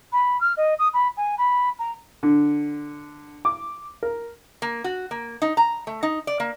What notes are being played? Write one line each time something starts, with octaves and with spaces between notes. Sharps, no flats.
B5
F6
D#5
D#6
B5
G#5
B5
A#5
D3
D6
A#4
A#3
F#4
A#3
D#4
A#5
A3
D#4
D5
A#3